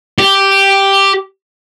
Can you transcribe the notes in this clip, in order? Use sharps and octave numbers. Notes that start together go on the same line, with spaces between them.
G4